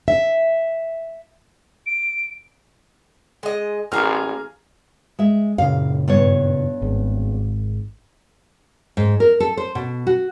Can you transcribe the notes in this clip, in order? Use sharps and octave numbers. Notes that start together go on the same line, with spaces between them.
E5
D7
G#3 D#5
A1 A#3 G#4 A#5 F6
G#3 E5
F#2 A#2 C#3 F5
G2 B3 C#5
G#1
G#2
A#4
A4
C5
B2
F#4